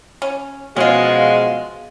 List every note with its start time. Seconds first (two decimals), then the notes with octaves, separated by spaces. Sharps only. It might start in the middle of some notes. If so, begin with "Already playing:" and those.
0.22 C#4
0.76 B2 F3 F#3 G#3 C#4 F4